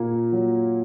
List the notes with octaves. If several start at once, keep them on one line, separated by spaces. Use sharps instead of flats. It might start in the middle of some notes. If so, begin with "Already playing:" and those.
Already playing: A#2 A#3
F#3